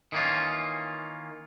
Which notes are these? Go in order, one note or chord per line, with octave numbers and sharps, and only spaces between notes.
D#3 E3 A#3 C#4 F4